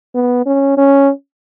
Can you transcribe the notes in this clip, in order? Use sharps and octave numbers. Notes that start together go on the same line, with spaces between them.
B3
C#4
C#4